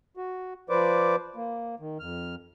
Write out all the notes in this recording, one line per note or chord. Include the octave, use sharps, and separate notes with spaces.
F#4
F3 B4 C5 D5 D6
A#3
D#3
F2 F6